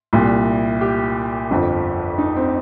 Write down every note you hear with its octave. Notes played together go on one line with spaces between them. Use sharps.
C2 A#2 G3
G4
G1 F2 F3
D#4
C4